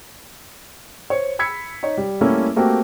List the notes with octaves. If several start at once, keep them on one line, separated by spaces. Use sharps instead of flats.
C5 C#5
B5 E6 G#6 B6 C#7
D#4 C#5
G3
G3 A3 A#3 C#4 E4 A4
A3 A#3 C4 F#4 G4